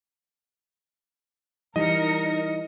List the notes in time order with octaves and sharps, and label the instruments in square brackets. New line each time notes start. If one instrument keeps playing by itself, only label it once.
[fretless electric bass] E3 G3 [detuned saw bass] D#4 [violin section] A#4 A#6 C#7 [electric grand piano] D#5